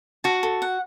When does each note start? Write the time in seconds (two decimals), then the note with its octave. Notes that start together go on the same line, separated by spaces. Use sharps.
0.24 F#4 A5
0.43 A4
0.62 F#5